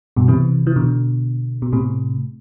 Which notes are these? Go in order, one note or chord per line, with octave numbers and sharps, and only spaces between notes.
G2 B2
C3 E3
E3
B2 D3
B2
A2 C3